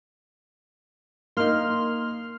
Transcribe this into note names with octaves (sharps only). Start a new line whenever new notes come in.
A#3 D#4 C6 F6